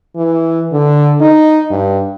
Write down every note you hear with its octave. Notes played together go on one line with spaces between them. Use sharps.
E3
D3
D#4
G2